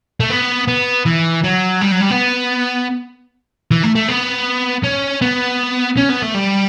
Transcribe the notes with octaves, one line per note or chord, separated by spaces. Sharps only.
A3
B3
B3
E3
F#3
G3
F#3
G3
B3
E3
A3
A3
B3
C#4
B3
C#4
B3
A3
G3